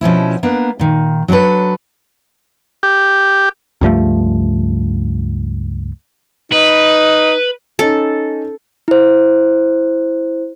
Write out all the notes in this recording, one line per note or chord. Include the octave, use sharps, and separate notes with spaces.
B2 F3 C#4 E4
A#3 B3 D4
A#2 D#3
F#3 D4 G4 A4 B4
G4
C#2 G2 F3 A3
D#4 B4
C#4 D#4 A4
E4 C5